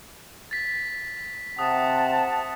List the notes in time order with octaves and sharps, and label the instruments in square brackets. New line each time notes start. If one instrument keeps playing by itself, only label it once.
[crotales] A6 B6
[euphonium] C3 [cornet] F#5 [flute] A5 [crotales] D#6